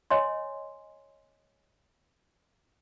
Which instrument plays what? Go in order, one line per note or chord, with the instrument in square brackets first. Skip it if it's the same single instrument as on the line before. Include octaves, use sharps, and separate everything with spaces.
[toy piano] C#5 D#5 G#5 C6